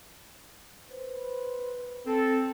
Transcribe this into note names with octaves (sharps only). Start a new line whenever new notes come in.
B4 C5
C4 A4